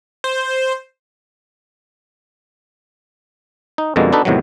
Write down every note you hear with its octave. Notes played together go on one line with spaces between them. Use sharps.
C5
D#4
F2 B2 D3 G3 G#3 A#3
B3 D4 D#4 F#4 A4 B4
E2 A2 C3 D#3 F#3